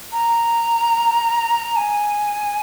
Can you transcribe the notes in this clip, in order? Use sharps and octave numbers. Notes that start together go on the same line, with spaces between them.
A#5
G#5